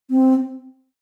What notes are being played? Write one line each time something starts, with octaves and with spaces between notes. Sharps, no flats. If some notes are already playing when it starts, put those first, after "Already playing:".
C4